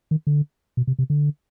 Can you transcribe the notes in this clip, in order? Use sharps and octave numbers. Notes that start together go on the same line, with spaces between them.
D#3
D3
B2
C3
C3
D3